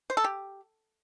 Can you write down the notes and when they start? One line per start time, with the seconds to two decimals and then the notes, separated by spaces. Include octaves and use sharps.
0.10 C5
0.17 A4
0.24 G4